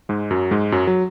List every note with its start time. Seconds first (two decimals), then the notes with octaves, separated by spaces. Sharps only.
0.09 G#2 G#3
0.31 F#2 F#3
0.51 G#2 G#3
0.72 F#2 F#3
0.87 F#3